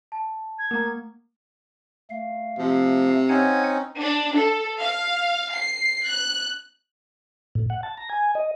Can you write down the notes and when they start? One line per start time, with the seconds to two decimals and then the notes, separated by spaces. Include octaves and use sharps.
0.12 A5
0.59 G#6
0.71 A3 A#3 A#4 A#5
2.10 A3 F5
2.59 C3 F3
3.29 C4 C#4 D#4 F#5 G#5 G#6
3.98 D4
4.36 A4
4.80 F5
5.53 C7
6.06 F#6
7.55 A2
7.70 F#5
7.83 A5
7.98 A#5
8.09 G#5
8.35 D#5